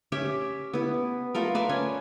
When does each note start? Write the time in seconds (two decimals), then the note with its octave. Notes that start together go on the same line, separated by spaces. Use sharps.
0.12 C#4 G4 E5
0.74 B3 E4
1.35 A3 F4 A4 A#4
1.55 B4 D5 E5
1.69 C#4 G#5